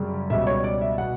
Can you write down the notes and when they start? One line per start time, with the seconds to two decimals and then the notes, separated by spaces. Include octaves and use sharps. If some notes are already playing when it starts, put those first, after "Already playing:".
Already playing: F#2 C#3 G3
0.30 C#2 B2 G3 E5
0.47 C#5
0.64 D5
0.81 E5
0.98 B2 F#5